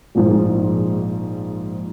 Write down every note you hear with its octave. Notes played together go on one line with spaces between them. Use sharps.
A#1 G#2 F3